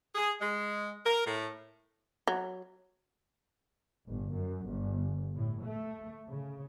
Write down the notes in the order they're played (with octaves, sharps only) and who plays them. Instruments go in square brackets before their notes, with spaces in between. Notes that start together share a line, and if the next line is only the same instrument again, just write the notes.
[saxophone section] G#4
G#3
A#4
A2
[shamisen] F#3
[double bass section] G1
F#2
G1
A2
A3
C#3